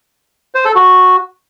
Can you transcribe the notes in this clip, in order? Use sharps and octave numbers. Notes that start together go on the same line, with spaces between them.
C5
A4
F#4